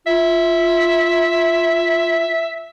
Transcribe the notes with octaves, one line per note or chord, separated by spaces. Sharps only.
F4 E5